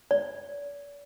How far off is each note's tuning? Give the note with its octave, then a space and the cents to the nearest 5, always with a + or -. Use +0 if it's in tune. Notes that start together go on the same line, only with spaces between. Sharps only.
D5 -45